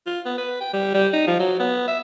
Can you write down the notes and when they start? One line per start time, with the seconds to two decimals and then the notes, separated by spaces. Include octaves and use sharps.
0.06 F4
0.25 B3
0.38 B4
0.60 G5
0.73 G3
0.94 G3
1.13 D#4
1.27 F3
1.39 F#3
1.59 B3
1.88 E5